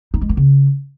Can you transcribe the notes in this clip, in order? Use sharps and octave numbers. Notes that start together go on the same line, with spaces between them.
D#4
G#3
A#3
C#3